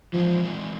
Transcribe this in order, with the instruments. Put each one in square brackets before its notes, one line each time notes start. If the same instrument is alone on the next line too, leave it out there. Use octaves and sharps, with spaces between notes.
[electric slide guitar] E3 G#3 C4 D#4 [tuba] F3